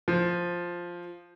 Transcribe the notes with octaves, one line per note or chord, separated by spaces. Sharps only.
F3